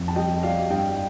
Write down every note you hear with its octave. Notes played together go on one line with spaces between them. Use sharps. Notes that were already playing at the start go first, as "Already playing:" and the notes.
Already playing: F2
A5
G3 D#5 G5
G3 D5 F5
G2 D#5 G5